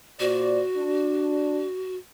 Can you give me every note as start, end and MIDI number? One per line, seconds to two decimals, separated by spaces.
0.20 0.60 46
0.20 1.97 66
0.20 0.60 72
0.20 0.60 74
0.77 1.64 62